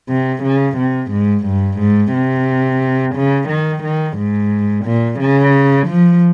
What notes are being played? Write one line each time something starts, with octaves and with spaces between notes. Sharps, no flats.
C3
C#3
C3
G#2
G2
G#2
C3
C#3
D#3
D#3
G#2
A#2
C#3
F3